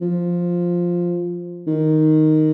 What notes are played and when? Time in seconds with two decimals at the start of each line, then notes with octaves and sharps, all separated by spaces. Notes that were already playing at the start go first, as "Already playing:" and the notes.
0.01 F3
1.67 D#3